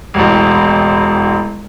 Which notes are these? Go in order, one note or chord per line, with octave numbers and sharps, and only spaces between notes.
E1 A1